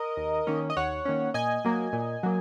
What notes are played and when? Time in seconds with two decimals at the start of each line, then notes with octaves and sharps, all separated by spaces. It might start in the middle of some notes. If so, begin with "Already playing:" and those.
Already playing: A#4 D#5
0.17 D#2
0.47 D#3 A#3 C#4
0.70 D#5
0.77 D#2 C#5 F#5
1.05 D#3 A#3 C#4
1.34 A#2 D#5 G#5
1.65 F#3 A#3
1.93 A#2
2.23 F#3 A#3